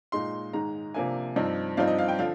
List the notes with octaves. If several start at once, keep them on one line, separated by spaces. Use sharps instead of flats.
A#2 G#3 D#4 C6
G#2 D#3 G#3 D#4 A#5
C3 F3 A#3 D4 G#5
G2 F3 C4 D#4
G2 F3 C4 D#4 F5
D#5
F5
G5
D3 F3 F5